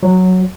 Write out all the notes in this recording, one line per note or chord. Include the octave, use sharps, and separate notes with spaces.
F#3